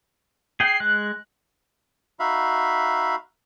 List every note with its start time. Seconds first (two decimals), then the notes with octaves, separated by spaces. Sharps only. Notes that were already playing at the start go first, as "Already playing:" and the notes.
0.60 G#4 G5 C7
0.80 G#3 F#6
2.20 D#4 F#4 E5 F5 B5